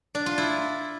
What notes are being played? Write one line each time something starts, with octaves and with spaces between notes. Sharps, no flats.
D4
F4
E4